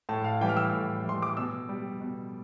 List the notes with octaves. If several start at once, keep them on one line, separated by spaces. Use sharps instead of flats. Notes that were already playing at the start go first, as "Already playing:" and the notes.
A2 A5
F5
E3 G3 G5
F6
E6
A2
E3 G3 C6
D6
B2 E6
G3
B2